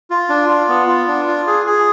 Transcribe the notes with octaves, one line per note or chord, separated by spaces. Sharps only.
F4
D4
F4
B3
F4
D4
F4
G#4
G#4